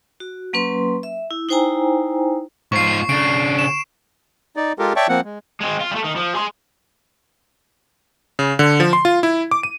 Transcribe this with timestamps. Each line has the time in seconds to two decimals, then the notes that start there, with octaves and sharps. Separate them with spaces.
0.20 F#4
0.53 F#3 A#3 C#4 B4 C6
1.03 E5
1.31 E4
1.49 D#4 E4 C5 G5 G#5 A#5
2.72 G#2 F4 C#6 C7
3.09 C#3 D4 D7
3.59 E7
4.56 D#4 D5
4.79 G#3 F4 G4 A4 A#4
4.96 C#5 D5 E5 G5 A5 C#6
5.09 F3 A#3 C4 F#5
5.25 G#3
5.60 G#3 C4
5.80 F4
5.91 G3 A3
6.04 D#3
6.16 F3
6.35 G#4 C6
8.39 C#3
8.59 D3
8.80 F3
8.93 C6
9.05 F4
9.23 E4
9.51 D6
9.63 D#7